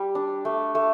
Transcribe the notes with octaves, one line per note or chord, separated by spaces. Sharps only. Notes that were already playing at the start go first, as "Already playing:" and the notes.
Already playing: G3
D4
A3
A3